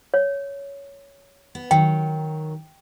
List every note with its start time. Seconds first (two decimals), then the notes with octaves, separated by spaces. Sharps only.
0.14 C#5
1.55 B3
1.71 D#3 F#3 G5